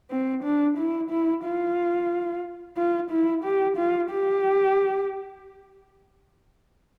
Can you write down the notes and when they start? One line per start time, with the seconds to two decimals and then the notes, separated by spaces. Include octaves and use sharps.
0.11 C4
0.43 D4
0.78 E4
1.11 E4
1.44 F4
2.77 F4
3.11 E4
3.44 G4
3.77 F4
4.11 G4